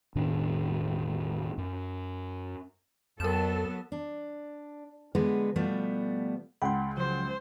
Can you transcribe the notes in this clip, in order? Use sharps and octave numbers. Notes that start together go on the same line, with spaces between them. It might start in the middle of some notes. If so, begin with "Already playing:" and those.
E1 A2 D#3 D4
F#2
F2 F#3 B3 A4 A#4 E7
D4
D3 F3 G#3 B3 B4
B2 F3 G3 A3 B3
C#2 F#5 G5 B5 C6
C#3 F3 F#3 C5